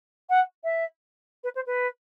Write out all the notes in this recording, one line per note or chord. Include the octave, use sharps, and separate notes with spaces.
F#5
E5
B4
C5
B4